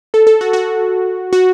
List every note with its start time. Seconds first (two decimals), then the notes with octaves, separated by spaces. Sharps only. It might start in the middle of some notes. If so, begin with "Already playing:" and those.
0.14 A4
0.27 A4
0.41 F#4
0.53 F#4
1.33 F#4